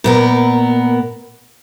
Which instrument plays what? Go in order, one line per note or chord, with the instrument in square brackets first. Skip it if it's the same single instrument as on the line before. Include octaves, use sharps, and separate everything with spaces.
[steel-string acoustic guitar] A#2 B3 A#4